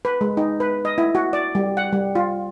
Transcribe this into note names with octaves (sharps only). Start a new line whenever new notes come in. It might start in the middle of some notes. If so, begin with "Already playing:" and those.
B4
G#3
D#4
B4
D#5
E4
F#4
D5
G3
F#5
G3
F4